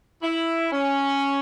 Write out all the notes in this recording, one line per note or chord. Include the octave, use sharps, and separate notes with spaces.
E4
C#4